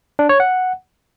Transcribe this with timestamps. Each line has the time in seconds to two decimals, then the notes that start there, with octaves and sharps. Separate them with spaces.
0.19 D4
0.29 C#5
0.40 F#5